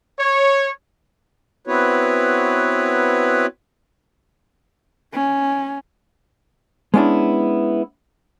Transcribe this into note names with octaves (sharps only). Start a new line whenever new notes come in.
C#5
B3 C4 E4 F#4 B4 C#5
C#4
G#3 B3 C#4 D4 E4